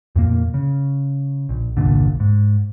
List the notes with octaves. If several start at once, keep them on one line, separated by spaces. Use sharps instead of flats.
F2 A#2 A#3
C#3
A#1
G1 C2 A#2 D3
G#2